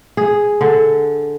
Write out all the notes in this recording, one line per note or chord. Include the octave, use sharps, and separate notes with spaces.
G#4
D3